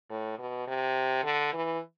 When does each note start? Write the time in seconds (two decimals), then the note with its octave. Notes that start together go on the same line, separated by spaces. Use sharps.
0.10 A2
0.39 B2
0.68 C3
1.24 D3
1.53 E3